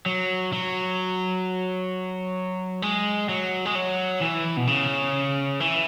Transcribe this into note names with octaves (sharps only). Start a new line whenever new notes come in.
F#3
F#3
G#3
F#3
G#3
F#3
E3
B2
C#3
E3